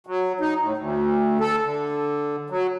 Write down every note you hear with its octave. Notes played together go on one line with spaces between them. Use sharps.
F#3
D#4
A2
D2
A4
D3
F#3